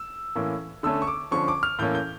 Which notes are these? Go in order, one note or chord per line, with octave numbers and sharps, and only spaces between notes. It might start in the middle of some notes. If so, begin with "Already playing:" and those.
Already playing: E6
A2 E3 A#3 C#4
D3 A3 C#4 E6
C#6
D6
D3 F3 C#4 C#6
D6
F6
A2 E3 A#3 C#4 G6
G6